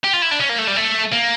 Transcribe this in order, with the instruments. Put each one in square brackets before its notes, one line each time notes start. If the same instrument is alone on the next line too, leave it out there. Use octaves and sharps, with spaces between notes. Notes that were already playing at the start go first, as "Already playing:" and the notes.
[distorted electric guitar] G4
F4
E4
D4
C#4
A#3
A3
G3
A3
A#3